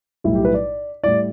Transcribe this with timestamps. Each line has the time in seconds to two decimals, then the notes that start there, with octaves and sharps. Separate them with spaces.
0.24 B1 A2 G3 E4
0.35 G4
0.45 B4
0.54 D5
1.03 A2 G3 E4 D5